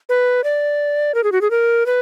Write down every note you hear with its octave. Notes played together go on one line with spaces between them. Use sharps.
B4
D5
A#4
G#4
F#4
G#4
A#4
B4